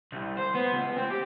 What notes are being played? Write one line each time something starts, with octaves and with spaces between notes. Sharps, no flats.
C2
C5
B3
C#2
C4
G4